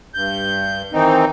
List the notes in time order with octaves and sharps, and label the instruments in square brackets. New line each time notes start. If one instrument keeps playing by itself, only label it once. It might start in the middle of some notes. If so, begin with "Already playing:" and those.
[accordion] G2 G6
D#3 E3 C4 D#4